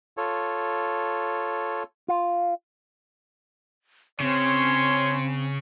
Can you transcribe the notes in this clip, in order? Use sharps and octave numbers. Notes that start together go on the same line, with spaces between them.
F4 A4 C#5
F4
C#3 C4 C#4 C#5 C6